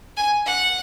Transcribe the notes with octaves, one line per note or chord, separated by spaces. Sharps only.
G#5
F#5